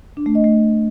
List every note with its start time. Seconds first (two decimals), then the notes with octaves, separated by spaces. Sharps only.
0.17 D4
0.26 A3
0.35 D#5
0.44 A3